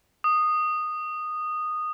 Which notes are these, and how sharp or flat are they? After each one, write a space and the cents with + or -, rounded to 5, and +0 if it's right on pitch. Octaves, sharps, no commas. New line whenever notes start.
D#6 -10